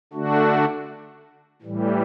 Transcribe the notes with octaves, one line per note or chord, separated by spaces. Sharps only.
D3 A3 D4 F#4
A2 E3 G3